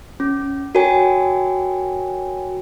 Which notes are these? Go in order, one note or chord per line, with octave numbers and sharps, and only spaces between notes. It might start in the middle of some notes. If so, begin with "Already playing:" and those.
C#4
F#4 A#4 C#5 G5 G#5